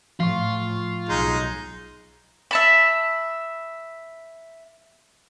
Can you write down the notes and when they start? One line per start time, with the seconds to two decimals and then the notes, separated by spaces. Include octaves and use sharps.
0.20 A2 F3 F4 C#6
1.09 B1 G#3 D#4
2.51 E5 A5 B5